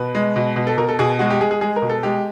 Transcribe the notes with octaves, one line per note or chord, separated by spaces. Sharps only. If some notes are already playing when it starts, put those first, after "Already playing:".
Already playing: B2 B4
G#3
B2
B2
A4
B2 A#4
A4
B2 G#4
G#3 F#4
G4
G#3 G#4
G#4
G#3 G#4
A#4
B2
A4
G#3 G4